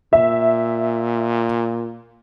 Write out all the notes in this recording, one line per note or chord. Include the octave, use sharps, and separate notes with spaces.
A#2 E5